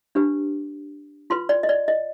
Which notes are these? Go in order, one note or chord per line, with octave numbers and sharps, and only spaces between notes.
D4 G4 B4
F4 B4 C6
D5
D#5
D5
D#5